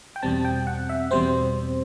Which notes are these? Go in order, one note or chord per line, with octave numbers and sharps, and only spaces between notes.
G5
E2 B2 G3 C4 A5
G5
F#5
E5
E2 B2 G3 C4 C5